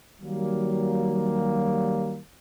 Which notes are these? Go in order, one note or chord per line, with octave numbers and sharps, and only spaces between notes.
D#3 F#3 G3 A#3